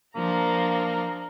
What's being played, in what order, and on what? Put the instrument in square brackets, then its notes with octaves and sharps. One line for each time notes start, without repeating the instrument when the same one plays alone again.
[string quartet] F3 D4 A#5 [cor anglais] A#3